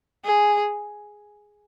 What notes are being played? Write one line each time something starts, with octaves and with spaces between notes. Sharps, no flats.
G#4